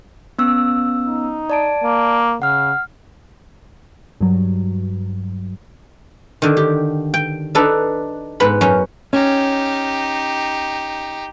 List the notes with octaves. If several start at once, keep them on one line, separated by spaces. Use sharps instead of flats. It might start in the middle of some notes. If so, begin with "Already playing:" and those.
B3 C#4 E6
D#4
D5 A5 D7
A#3
C#3 F#5 F6
G2 F#3
D3 D#3
G4
G5
D4 D#4 A4 B4
G#2 B3 B4 B5
F#2 C#4
C#4 D#4 G4